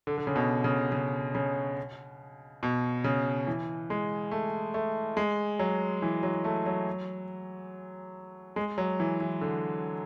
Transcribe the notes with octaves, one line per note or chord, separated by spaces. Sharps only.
D3
D3
C#3
B2
C#3
C#3
C#3
B2
C#3
E3
G#3
A3
A3
G#3
F#3
E3
F#3
A3
F#3
G#3
F#3
E3
E3
D3